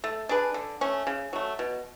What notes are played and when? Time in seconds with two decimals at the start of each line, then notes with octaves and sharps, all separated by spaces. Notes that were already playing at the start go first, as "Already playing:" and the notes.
0.04 A3
0.29 D4 G#4 B4
0.54 D3
0.81 A3 C#4
1.07 C#3
1.33 F#3 A3
1.59 B2